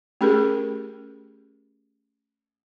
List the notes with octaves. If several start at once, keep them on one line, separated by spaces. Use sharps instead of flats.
A3 C#4 G4 G#4 A#4